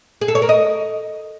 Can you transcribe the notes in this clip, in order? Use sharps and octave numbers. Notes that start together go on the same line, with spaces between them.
G#4
A4
C#5
A#4
D#5